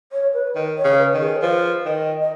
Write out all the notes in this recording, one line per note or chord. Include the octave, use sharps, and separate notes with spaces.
C#5
B4
D#3
C#5
C#3
B4
D#3
G#4
C#5
F3 B4
D#3 D#5
D#5